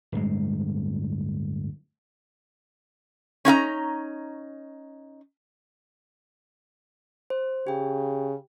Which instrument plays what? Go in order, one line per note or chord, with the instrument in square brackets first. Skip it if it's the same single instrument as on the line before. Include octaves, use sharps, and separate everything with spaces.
[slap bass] D1 G2 G#3
[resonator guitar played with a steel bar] C#4 D#4 F5 A#5
[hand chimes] C5
[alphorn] C#3 [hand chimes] G4 G5